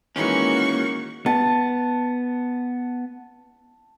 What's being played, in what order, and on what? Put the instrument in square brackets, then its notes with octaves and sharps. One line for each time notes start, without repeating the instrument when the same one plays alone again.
[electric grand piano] D#3 E3 G#3 [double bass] A#3 [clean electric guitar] C#4 [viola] F#4 C#6
[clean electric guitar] B3 [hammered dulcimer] A5